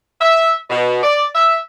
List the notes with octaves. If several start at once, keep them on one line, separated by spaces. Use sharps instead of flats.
E5
B2
D5
E5